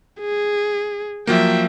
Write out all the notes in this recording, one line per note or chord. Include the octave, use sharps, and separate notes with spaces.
G#4
F3 F#3 A#3 E5 G5